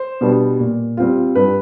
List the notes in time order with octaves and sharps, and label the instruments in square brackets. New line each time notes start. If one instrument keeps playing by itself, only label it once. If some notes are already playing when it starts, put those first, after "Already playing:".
Already playing: [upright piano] C5
B2 G3 B3 D4
A#2
G3 C4 F4
G2 B4